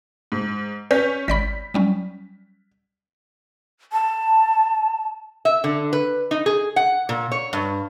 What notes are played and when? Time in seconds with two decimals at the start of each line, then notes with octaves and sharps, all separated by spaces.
0.32 G#2
0.91 C#4 B4 G6 B6
1.28 G#1 D5 B5 B6
1.74 F#3 G3 C#4
3.93 A5
5.45 E5
5.64 D3
5.93 B4
6.31 D#4
6.46 G#4
6.76 F#5
7.09 A#2
7.31 C#5
7.53 G2